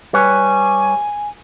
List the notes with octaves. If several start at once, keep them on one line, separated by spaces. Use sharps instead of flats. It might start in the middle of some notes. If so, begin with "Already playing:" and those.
G3 B4 C#5 G#5